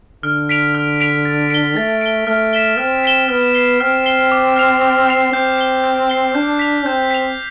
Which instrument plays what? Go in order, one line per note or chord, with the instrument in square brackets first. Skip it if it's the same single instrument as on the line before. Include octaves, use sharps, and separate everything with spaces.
[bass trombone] D3 [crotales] F6
[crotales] B6 D7 F7
F6
B6 D7 F7
A6
D7 G7
[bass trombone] A3 [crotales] A6
[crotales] D7 G7
[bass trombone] A3 [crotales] F6
[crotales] B6 E7 G7
[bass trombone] C4 [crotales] F6
[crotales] B6 E7 G7
[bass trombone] B3 [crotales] F6
[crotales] C7 G7
[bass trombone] C4 [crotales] F6
[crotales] C7 G7
D6
F6 C7 F7
D6
F6 C7 F7
[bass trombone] C4 [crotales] G6
[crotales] C7 G7
G6
C7 G7
[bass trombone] D4 [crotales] G6
[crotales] B6 F7
[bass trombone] C4 [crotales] G6
[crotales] B6 F7